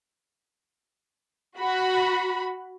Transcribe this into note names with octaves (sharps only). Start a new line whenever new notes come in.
F#4 B5